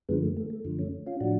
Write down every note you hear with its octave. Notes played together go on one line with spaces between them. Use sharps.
F#2 D3 F3 G#3 B3
A3
A3
A3
F#2 D3 F3
A3 C#4
C#4 F4
A2 F3 D4 F#4